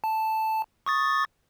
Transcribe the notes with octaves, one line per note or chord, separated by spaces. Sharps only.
A5
C#6 D#6 A6